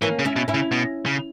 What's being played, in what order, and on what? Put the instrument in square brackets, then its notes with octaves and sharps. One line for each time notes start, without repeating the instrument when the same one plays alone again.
[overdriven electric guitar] E3 [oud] A#3 C#4
[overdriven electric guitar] C#3
[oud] C#4 E4
[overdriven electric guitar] B2
[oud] C#4 E4
[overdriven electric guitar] C#3
B2
C#3